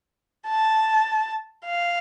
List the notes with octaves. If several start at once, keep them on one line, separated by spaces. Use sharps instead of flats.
A5
F5